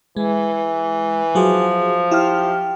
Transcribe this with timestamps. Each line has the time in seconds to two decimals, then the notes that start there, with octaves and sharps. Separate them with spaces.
0.17 E3 G#3
1.35 F3 F#3 F#4 G#4
2.11 E4 G4 F6